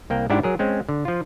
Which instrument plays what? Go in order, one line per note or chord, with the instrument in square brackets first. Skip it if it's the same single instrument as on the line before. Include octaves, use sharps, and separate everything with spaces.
[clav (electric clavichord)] C2 A#3 G5
G#2 D4 E4 G4 F#5 A5
F#3 G#4 A#4
G#3 C4 C#4
D3
F3 F4